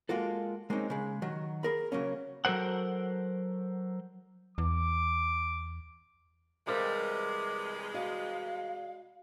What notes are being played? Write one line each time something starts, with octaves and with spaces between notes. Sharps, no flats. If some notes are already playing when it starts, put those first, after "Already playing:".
G#3 A#3 F4 F#4 A4
G#3 A#3 C4 C#4 D#4
C#3 G#3
D#3 F#3
G#4 A#4 B5
C#3 F#3 A#3 C#4
F#3 A4 A#4 C5 F#5
E2 D6
C3 E3 G3 G#3 A#4 C5 F5
F#4 D#5 F5